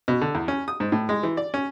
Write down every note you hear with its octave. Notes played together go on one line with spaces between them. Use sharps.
B2
D3
E2
C#4
D#6
G#2
A2
G#3
E3
D5
C#4